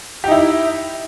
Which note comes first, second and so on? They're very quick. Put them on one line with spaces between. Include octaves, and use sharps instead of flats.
G4 D#4 E4